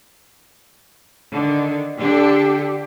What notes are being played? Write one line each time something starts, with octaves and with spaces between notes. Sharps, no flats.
D3 D#3
D3 D4 G4 A4